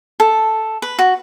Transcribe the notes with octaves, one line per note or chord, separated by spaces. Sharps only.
A4
B4
F#4